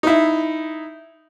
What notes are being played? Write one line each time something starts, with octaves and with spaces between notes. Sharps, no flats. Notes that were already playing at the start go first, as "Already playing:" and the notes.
D#4 E4